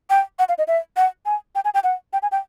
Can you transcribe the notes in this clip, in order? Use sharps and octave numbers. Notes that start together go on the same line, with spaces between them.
G5
F#5
F5
D#5
E5
F#5
G#5
G5
G#5
G5
F#5
G5
G#5
G5